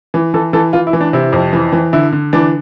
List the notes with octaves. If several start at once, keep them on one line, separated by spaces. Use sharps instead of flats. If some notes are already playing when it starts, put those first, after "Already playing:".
E3
E3 A4
E3 A4
E3 F4
E4
E3
D4
C3 E4
F2
E3
E3
D3 E4
D3
E3 D4